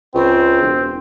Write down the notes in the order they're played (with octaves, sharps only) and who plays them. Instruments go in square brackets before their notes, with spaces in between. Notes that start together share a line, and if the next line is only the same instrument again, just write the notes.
[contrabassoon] C#2 [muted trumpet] C4
[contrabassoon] E1